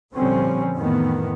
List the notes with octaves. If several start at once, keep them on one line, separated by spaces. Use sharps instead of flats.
A#2 D3 F3 G3 C4 C#4
F2 A2 D#3 E3 A3 B3